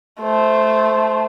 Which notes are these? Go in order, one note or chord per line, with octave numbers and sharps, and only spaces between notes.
A3 C5